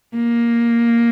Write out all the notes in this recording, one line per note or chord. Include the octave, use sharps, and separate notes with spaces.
A#3